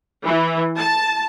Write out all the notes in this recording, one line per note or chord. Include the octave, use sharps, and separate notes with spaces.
E3
A5